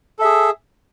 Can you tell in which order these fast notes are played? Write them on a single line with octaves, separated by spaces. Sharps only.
A4 E5 G#4